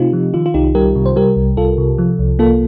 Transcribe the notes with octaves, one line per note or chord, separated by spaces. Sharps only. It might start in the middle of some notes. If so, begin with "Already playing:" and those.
Already playing: C3 A3 C4 D#4 F4 G4
F3
D#3 F4
F4
C2 D#4 G4
G3 G4 A#4
C3
C5
G3 G4 A#4
C2
C2 F4 A4
C3
F3
C2
A#3 F4 A4